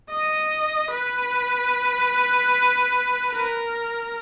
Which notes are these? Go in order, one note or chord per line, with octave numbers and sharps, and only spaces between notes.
D#5
B4
A#4